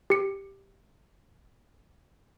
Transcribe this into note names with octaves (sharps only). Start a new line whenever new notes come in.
G4 C#7